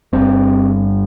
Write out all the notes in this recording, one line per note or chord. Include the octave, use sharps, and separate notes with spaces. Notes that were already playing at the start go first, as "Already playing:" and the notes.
G1 G2 C4